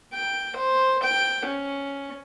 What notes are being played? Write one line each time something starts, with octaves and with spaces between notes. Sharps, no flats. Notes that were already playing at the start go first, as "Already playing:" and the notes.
G5
C5
G5
C#4